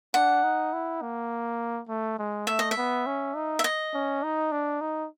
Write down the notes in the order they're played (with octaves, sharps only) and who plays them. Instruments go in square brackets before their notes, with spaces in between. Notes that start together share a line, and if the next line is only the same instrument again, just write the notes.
[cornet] D4 [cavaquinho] F#5
[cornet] D#4
E4
A#3
A3
G#3
[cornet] A3 [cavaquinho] E5
[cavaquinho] D#5
E5
[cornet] B3
C#4
D#4
[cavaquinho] E5
D#5
[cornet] C#4
D#4
D4
D#4